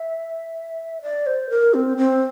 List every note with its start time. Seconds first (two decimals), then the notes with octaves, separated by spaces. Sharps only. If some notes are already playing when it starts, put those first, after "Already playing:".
Already playing: E5
1.02 D5
1.26 C5
1.50 A#4
1.74 C4
1.98 C4